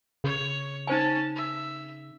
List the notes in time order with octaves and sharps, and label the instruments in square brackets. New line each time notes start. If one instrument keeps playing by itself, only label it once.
[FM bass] C#3 [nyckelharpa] C#5
[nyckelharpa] C#4 A5 [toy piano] D#4 C5 G#5
[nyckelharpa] E5